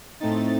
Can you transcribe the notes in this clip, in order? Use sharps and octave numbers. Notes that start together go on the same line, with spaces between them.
A2 A3 C4 D#4 A6